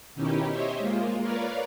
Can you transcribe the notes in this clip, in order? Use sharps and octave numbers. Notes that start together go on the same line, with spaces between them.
B2 D#3 C#4 D#4 E4 G4
G4 C5 C#5 D#5 E5
G#3 A#3 F4
A#4 B4 C#5 D5 F5